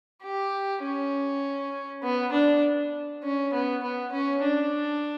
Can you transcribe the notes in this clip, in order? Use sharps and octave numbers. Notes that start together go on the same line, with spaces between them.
G4
C#4
B3
D4
C#4
B3
B3
C#4
D4